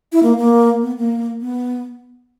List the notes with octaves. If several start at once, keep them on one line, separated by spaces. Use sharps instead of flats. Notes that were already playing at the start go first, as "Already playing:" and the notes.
E4
A#3
A#3
B3
A#3
B3